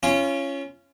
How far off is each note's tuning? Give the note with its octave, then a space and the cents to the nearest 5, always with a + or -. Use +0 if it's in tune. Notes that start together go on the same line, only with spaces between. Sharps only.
C#4 +0 F4 -35